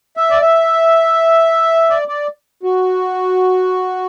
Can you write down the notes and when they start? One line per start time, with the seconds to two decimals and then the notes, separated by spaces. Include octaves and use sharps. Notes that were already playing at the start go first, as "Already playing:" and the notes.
0.17 E5
0.30 D5
0.42 E5
1.90 D5
2.08 D5
2.63 F#4